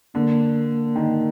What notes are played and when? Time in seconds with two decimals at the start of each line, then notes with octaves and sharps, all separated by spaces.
0.15 D3 A#3
0.96 D#3